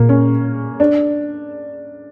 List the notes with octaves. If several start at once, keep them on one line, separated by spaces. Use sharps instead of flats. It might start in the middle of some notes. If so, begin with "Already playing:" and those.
Already playing: A#2 A#3
C#4
D4